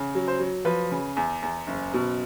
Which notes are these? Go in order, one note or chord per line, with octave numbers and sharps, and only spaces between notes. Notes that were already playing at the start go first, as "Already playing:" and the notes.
Already playing: C#3
F#3
C5
F#3
F3 B4
C#3
E2
E2
F#1
B2